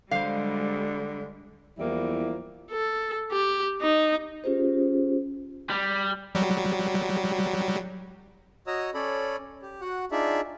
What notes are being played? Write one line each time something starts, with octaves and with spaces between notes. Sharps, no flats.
D3 G3 G#3 C5 F5
E2 F3 G3 A#3 E4
A4
G4
D#4
C#4 F4 G4 G#4 C5
G3
F#3 G3
F#4 C#5 D#5 A#5 D#6 E6
C#4 A4 C#5 D5 B5
G4
F#4 F#5
D4 D#4 F4 G#4 D5 E5